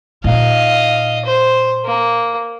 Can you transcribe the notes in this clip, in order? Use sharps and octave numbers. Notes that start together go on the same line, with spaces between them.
A#2 D#4 D#5 F5
C5
A#3